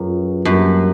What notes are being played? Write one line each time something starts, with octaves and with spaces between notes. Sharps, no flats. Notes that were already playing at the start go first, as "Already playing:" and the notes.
Already playing: F#2 F4 G#4 B4
F#2 G3 A#3 D4 G4 A#4